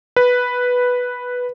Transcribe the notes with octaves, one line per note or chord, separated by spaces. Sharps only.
B4